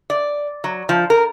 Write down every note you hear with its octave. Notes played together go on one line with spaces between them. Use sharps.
D5
F#3
F3
A#4